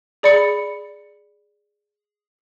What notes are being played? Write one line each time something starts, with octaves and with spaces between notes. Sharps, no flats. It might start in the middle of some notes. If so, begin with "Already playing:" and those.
G#4 D5 B5 C#7